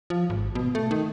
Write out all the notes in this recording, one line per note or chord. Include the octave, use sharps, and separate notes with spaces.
F3
G#1
B2
A3
D#3